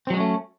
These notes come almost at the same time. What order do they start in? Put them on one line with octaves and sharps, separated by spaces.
C4 F#3 G#3 C#4 A3